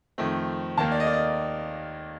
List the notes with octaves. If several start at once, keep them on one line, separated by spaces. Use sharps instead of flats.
F2 D#3 A3 C4
D#2 D#3 A#3 A5
D5
D#5
D5
D#5